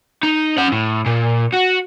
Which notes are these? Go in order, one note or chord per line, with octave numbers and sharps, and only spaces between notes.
D#4
C#4 F#5
A2
A#2
F#4